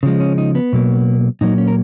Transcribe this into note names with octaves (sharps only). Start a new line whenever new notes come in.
C#3 F3 G#3
C#4
D#4
B3
B2 F#3 A#3
A#2 F#3 A#3 D#4
C#4
A#4